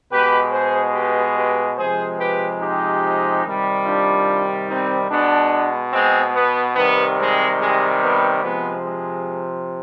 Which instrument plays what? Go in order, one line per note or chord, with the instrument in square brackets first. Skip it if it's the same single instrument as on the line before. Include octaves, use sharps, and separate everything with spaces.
[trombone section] B2 G#3 G4 B4
G#4 C5
G4 B4
G4 B4
C3 F3 G#3 G#4 C5
G4 B4
D#4 G4
C3 D#3 G3
D4 F4
C4 D#4
B2 G#3 B3 D4
G#3 C4
B3
C3 D#3 G3 B3
G#3 C4
G#3
B3
C3 F3 G#3 B3
G#3